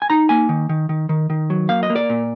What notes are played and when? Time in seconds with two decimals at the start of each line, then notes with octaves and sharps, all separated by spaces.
0.02 G#5
0.10 D#4 A#5
0.29 A#3 G#5
0.49 D#3
0.69 D#3
0.89 D#3
1.09 D#3
1.30 D#3
1.50 F#3
1.69 A#3 F5
1.83 D#5
1.90 A#3
1.96 D5
2.10 A#2